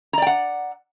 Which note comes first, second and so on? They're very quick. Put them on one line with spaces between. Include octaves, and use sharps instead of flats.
A#5 D5 G5 F#5